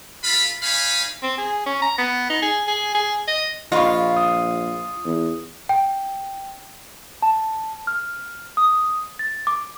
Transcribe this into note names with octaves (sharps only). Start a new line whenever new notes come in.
F4 A4 F5 B5
D#4 C#5 F5 G#5 B5
C4
G#4
C#4
A#5
B3
D#4
G#4
G#4
G#4
D#5
A#1 F4 D#5 B5 C#6
D#6
E2
G5
A5
F6
D#6
A6
D6